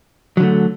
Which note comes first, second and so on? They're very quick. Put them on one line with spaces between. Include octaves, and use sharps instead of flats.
F#3 D3 A3